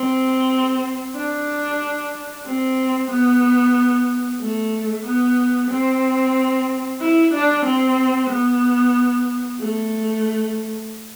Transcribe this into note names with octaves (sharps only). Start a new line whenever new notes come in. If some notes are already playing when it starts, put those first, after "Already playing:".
Already playing: C4
D4
C4
B3
A3
B3
C4
E4
D4
C4
B3
A3